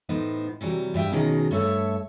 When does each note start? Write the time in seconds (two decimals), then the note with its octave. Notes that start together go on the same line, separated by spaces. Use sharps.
0.09 A2 B3 D#4 C5
0.61 C3 E3 F#3 G3
0.94 G2 G3 E5 G5
1.12 B2 D#3 F#3 C#4 D#4 G#4
1.51 G2 A3 C#5 E5 A5